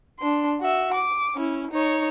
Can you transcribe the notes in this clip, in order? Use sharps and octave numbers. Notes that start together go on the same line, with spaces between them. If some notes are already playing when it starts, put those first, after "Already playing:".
D4 C6
F#4 E5
D6
C#4 E4
D#4 C#5